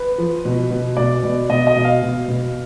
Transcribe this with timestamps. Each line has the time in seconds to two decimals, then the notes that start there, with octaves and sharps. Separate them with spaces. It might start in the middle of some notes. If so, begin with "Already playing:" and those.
Already playing: B4
0.18 F3
0.45 B2
0.70 B2
0.97 B2 D5
1.23 B2
1.49 B2 D#5
1.67 D#5
1.76 B2
1.85 F5
2.02 B2
2.28 B2